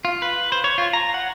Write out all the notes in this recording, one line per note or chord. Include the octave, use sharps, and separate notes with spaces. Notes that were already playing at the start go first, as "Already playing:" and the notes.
F4
B4
C5
C#5
F4
A#5
F#5